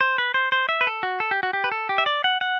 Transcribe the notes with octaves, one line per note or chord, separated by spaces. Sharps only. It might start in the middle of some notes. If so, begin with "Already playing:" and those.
C5
B4
C5
C5
E5
B4
A4
F#4
A4
G4
F#4
G4
B4
A4
G4
E5
D5
F#5
F#5